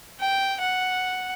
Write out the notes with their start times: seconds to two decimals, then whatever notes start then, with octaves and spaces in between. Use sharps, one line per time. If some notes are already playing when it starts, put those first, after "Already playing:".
0.20 G5
0.60 F#5